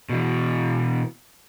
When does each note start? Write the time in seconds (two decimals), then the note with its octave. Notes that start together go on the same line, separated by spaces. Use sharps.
0.09 B2 E3